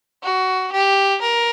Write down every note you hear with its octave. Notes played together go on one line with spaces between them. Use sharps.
F#4
G4
A#4